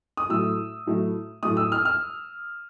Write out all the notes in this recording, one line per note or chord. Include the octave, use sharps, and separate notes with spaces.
D#6
A2 F#3 A3 E6
A2 F#3 A3
A2 F#3 A3 D#6
E6
F6
F6